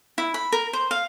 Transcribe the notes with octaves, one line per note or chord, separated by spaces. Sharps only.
E4
B5
A#4
C5
F5